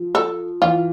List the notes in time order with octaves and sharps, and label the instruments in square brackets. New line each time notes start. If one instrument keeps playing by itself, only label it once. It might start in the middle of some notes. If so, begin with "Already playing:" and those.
Already playing: [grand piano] F3
[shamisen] A4
[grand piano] E3 [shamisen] F4